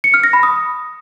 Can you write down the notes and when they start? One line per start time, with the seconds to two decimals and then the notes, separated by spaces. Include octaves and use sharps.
0.04 C#7
0.14 F6
0.24 A#6
0.33 B5
0.43 D#6